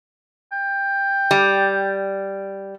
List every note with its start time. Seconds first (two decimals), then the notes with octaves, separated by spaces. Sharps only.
0.52 G5
1.31 G3